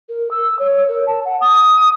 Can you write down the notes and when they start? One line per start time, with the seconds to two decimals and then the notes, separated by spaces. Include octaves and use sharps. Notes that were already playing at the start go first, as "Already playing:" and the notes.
0.09 A#4
0.31 E6
0.59 C#5
0.88 A#4
1.07 A5
1.25 F#5
1.40 D#6